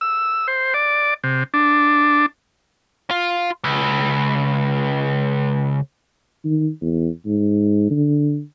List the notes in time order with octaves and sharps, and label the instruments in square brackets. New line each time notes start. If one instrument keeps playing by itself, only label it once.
[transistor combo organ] E6
C5
D5
C3
D4
[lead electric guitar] F4
C#2
[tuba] D#3
E2
G#2
D3